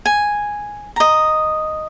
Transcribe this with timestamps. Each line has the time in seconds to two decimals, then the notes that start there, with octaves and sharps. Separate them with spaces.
0.06 G#5
0.96 D#5 A#5